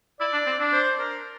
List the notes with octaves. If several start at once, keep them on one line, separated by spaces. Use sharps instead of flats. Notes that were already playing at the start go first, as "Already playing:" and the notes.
E4 D5
D4
C4
D4
C5
A#4